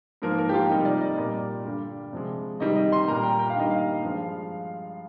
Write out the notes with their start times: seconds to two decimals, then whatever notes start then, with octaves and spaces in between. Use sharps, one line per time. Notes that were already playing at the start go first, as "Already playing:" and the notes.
0.22 G#2 F3 A#3 A#4
0.38 A#4
0.49 G4
0.54 F4
0.69 C3 G3 A#3 D#4
0.85 D5
1.01 D#5
1.17 A#2 G3 A#3 D5
1.65 G2 D3 G3
2.13 C3 F3 G#3
2.59 C3 D#3 G3 D#5
2.75 D#5
2.92 C6
3.08 A#2 G3 A#3 A#5
3.23 G5
3.39 G5
3.50 F5
3.55 G2 D#3 G3 A#3 D#5
3.70 F5
4.02 G2 F3 G#3